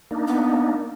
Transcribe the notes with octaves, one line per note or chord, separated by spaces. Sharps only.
A#3 D4 D#4
B3